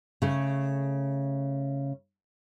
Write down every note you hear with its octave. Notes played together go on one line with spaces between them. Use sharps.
C#3 A3